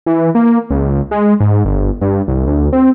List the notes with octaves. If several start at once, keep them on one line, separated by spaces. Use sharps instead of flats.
E3
A#3
C#2
G#3
G#2
G1
G2
C2
D2
C4